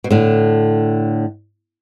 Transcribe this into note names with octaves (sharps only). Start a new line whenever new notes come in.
B2
A2 D3